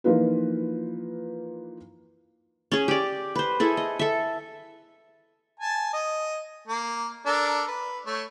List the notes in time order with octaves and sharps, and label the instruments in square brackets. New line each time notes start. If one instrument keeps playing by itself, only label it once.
[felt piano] E3 F3 A#3 D#4 F4 B4
[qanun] C#4 G#4
G4 D5
B4 C5
E4 G#4 A4
D#5
A4 E5
[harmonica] G#5 A5
D#5
A#3
D4 A4 A#4
B4
A3 C#5